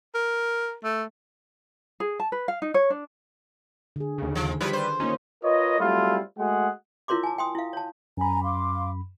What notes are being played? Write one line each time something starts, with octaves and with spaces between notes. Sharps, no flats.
A#4
A3
G#4
A5
B4
F5
D#4
C#5
D4
D3 G#4
D#2 C#3
D#3 F3
F3 G3 E4 B4
C5
A#3 C#4 D#4 F4
F4 A#4 B4 C#5 D#5
F#3 G3 A3 C4 E4 F4
G#3 A3 F#4 G#4 F#5
E4 F4 A#4 C#5 C6 D6
G#5 A5
G5 C6 D#6
E4 F5
C#5 A5
F#2 G#5 A#5 B5
F5 C6 D6